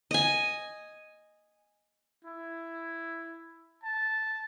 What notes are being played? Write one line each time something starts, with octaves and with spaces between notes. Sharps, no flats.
D#5 G#5
E4
A5